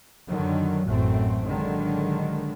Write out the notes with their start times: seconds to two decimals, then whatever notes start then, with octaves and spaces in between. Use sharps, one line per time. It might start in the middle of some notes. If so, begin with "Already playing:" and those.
0.27 F#2 D3 D#3 F#3
0.86 A1 F#2 A2 F#3 A3 C4
1.46 D3 D#3 F#3 G#3